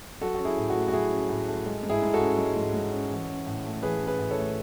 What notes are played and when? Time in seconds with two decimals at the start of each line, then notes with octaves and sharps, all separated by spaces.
0.21 F#3 F#4 A4
0.35 C#4 F#4
0.45 E4 G#4
0.57 A2
0.70 F#4
0.75 A3
0.88 F#4
0.93 F#3 E4 G#4
1.12 C#4
1.29 A2
1.48 A3
1.66 G#3
1.83 G#2
1.90 E4 G#4
2.02 G#2
2.14 F#4 A4
2.20 C#4
2.38 G#3
2.56 G#2
2.74 G#2
2.92 C#4
3.11 E3
3.29 C#4
3.46 A2
3.66 A3
3.83 E3 G#4 B4
4.01 C#4
4.07 G#4 B4
4.19 A2
4.31 A4 C#5
4.38 A3